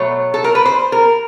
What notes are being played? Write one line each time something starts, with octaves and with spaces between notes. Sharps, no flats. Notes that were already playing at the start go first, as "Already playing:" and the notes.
Already playing: B2 F#3 A3 C#5
A4
A#4
B4
C5
A#4